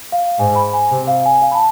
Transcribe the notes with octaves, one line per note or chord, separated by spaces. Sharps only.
F5
G#2 G#5
B5
G#5
C3
F5
G#5
F5
B5
A5